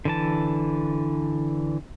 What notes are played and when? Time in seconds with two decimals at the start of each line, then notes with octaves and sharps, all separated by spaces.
0.05 D3 E3 A5